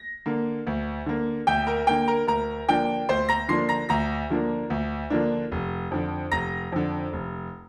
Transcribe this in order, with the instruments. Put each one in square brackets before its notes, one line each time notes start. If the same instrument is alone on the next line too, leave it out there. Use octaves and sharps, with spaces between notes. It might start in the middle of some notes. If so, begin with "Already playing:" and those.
Already playing: [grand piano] A#6
D3 A#3
D2
D3 A#3
D2 G5 G6
A#4 A#5
D3 A#3 G5
A#4 A#5
D2 A#4 A#5
D3 F3 A#3 D4 G5
D2 C5 C6
A#5 A#6
D3 F3 A#3 D4 C6 C7
A#5 A#6
D2 A#5 A#6
D3 F3 A#3 D4
D2
D3 F3 A#3 D4
F1
F2 D3
F1 A#5 A#6
F2 D3
F1